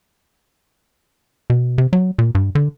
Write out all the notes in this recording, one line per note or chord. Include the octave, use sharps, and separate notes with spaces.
B2
C3
F#3
A#2
G2
D3